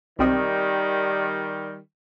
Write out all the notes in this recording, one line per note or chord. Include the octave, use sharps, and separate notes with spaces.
B1 D#3 G3 C4 D#5